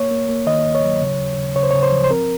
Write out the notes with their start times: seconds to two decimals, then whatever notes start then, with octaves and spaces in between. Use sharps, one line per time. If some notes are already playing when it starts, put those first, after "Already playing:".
Already playing: A#3 C#5
0.11 A#3
0.29 A#3
0.46 D#3 D#5
0.66 D#2
0.75 C#5
0.84 F#3
1.01 C#3
1.19 D#2
1.37 C#3
1.56 C#3 C#5
1.63 C5
1.71 C#3 C#5
1.83 C5
1.92 F3
2.04 C5
2.10 C4 A#4